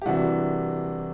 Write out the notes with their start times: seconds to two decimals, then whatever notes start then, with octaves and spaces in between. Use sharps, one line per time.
0.02 G4
0.06 C2 C3 E3 D4 F#4